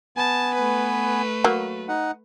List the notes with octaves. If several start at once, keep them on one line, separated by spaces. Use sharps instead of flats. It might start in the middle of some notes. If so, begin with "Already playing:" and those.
B3 G#5 A5
A3 B4
F#3 A#3
D#4 F#5